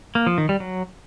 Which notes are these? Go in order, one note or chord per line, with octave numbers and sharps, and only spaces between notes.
A#3
F3
D#3
G3
F#3